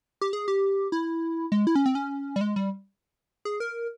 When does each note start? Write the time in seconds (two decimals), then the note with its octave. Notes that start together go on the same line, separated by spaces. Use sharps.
0.21 G4
0.33 G#4
0.48 G4
0.92 E4
1.52 G#3
1.67 E4
1.75 C#4
1.86 C4
1.95 C#4
2.36 G3
2.41 G#3
2.56 G3
3.45 G#4
3.60 A#4